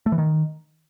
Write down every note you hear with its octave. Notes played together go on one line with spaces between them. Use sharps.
A3
E3
D#3